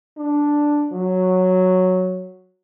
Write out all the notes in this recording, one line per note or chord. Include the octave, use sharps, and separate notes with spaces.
D4
F#3